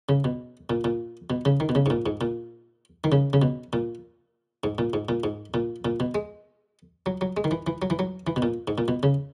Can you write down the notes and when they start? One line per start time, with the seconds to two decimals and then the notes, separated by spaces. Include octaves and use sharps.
0.09 C#3
0.24 B2
0.70 A#2
0.84 A#2
1.30 B2
1.45 C#3
1.60 D#3
1.69 B2
1.75 C#3
1.86 G#2
1.90 A#2
2.06 G#2
2.21 A#2
3.04 D#3
3.12 C#3
3.33 C#3
3.42 B2
3.73 A#2
4.64 G#2
4.78 A#2
4.93 G#2
5.09 A#2
5.24 G#2
5.54 A#2
5.85 A#2
6.00 B2
6.15 G#3
7.06 F#3
7.21 F#3
7.37 G#3
7.44 D#3
7.51 E3
7.67 E3
7.82 F#3
7.90 E3
7.99 F#3
8.27 E3
8.36 B2
8.42 A#2
8.68 G#2
8.78 A#2
8.88 B2
9.03 C#3